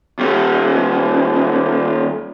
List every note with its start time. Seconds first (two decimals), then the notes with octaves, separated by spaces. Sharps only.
0.19 D#2 G3